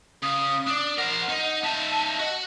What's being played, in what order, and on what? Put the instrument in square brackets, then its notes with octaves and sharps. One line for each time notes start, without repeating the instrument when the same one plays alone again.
[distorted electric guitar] C#3 [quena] D#6
[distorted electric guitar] D4
[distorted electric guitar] A#4 C5 [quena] F#5
[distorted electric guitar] D#4
[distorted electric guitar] D#4 E5 [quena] A5
[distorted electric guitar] F#4 [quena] D#5